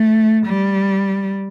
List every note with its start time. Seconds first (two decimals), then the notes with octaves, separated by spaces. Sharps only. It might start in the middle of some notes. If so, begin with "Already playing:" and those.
Already playing: A3
0.47 G3